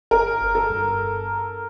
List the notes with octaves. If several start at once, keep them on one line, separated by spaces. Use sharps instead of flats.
G1 A#4
G1
A4
G2